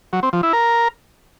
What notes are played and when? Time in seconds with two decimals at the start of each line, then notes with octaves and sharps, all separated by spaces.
0.13 F#3
0.23 C4
0.33 F3
0.43 E4
0.53 A#4